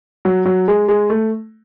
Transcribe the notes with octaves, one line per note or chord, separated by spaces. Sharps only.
F#3
F#3
G#3
G#3
A3